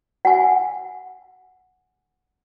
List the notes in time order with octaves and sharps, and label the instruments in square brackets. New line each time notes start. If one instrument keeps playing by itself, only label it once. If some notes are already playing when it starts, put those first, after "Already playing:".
[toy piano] F#5 G#5